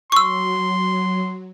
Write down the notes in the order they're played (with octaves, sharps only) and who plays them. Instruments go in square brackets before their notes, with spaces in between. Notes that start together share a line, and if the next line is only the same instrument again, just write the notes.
[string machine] F#3 [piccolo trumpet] C6 [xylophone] C#6 E6